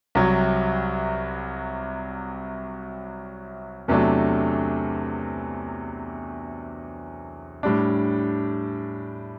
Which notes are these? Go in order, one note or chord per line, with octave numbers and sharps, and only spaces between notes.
C2 C3 F#3
E2 C3 F#3 A3 D4
A2 G3 D4